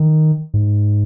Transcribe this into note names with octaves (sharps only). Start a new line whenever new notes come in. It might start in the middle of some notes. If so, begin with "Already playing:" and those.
Already playing: D#3
G#2